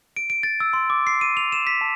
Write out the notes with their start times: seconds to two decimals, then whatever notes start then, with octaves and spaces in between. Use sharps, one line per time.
0.17 D7
0.30 D7
0.43 A6
0.60 E6
0.73 C6
0.90 D6
1.07 C7
1.21 D#7
1.37 F7
1.52 E7
1.67 B6
1.81 A5